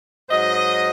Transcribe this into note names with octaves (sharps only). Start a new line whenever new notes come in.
G#2 F#3 C5 D#5